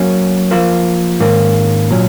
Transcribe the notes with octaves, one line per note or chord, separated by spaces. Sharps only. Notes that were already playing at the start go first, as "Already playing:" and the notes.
Already playing: F#3 A#3 C#4
F3 A#3 F4 A#4
G#2 D#3 A#3 C#4
A#2 F#3 C#4